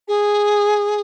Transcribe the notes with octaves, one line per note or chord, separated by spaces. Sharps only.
G#4